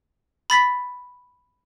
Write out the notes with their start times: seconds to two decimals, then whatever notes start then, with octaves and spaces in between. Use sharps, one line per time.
0.50 B5 A6 B6